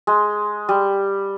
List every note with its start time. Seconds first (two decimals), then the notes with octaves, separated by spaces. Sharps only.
0.07 G#3
0.69 G3